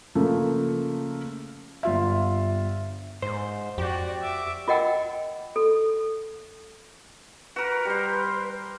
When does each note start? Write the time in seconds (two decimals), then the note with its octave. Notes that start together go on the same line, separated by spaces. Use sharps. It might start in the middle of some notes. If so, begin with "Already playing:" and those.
0.15 C#3 F3 A3 A#3
1.83 G1 F4 E5
3.22 G#2 C5
3.78 F2 F#4 G4 D5
4.22 E5 D6
4.68 F4 A#4 D#5 F#5 G5 E6
5.56 A4
7.56 F#4 A#4 B4
7.85 G3 C5